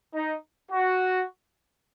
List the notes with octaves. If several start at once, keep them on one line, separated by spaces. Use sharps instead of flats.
D#4
F#4